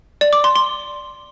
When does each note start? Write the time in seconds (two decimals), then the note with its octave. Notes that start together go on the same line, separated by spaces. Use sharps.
0.21 D5
0.33 D6
0.44 C6
0.56 C6